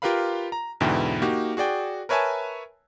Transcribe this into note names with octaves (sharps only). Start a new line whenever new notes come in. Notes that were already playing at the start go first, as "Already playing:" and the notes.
F4 G4 A#4 B4 F5 B5
A#5
E2 G#2 B2 D3 E4 G5
A#3 D#4 F#4 G4
F#4 G#4 D5 G5
A#4 B4 C#5 E5 G#5 A5